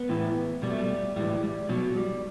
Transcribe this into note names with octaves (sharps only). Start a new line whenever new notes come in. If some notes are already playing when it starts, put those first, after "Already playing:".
Already playing: B3
A2 E3
B2 G3
A3
G3
A2 E3 G3
G3
B2 F#3
G3